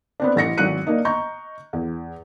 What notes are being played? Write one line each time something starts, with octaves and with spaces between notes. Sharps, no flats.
B3 C4 D4
A1 A6 A#6 C#7
G#1 F#3 F#6 C#7 D#7
A#3 D4 D#4
D#5 A#5 C#6 G6
E2